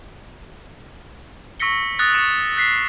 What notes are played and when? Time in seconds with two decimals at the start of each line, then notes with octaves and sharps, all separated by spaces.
1.60 C#6 E6 A#6 B6 C#7 G7
1.99 D#6 E6 F#6 A6 A#6
2.14 C#6 C#7 E7
2.57 F#6 B6 C7